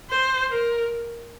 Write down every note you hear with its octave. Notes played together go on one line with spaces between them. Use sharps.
C5
A#4